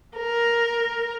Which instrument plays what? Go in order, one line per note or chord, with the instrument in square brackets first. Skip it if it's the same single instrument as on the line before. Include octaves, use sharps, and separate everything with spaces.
[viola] A#4